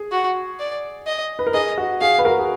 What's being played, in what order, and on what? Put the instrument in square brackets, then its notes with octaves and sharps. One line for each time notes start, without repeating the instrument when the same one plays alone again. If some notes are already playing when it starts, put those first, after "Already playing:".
Already playing: [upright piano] G#4
[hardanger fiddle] F#4
D5
D#5
[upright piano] B4
A#4
[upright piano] G#4 [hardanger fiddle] D#5
[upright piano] F#4
[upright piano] G#4 [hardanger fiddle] F5
[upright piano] B4
F#4 A#4
G#4